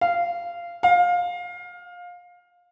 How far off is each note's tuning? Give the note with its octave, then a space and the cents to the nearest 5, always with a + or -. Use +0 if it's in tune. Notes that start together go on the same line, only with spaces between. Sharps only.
F5 -15
F5 +20